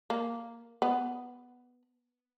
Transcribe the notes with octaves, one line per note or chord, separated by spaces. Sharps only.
A#3
B3